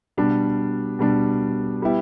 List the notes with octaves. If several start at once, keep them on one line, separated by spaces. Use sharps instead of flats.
B2 G3 D4
B2 G3 D4
G3 B3 E4 G4